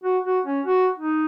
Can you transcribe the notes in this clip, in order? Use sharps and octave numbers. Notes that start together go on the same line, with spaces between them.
F#4
F#4
C#4
F#4
D#4